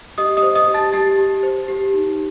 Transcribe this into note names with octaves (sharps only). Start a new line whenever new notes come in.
G4 D#5 D#6
D#5 D#6
C5
D#5 D#6
G4
A5 A6
G4 A5 A6
G4
C5
G4
D#4